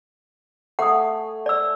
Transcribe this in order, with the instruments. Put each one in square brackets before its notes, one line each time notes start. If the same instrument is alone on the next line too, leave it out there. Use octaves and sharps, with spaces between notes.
[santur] A3 G#5 [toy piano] F#5 D#6
[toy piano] D5 E6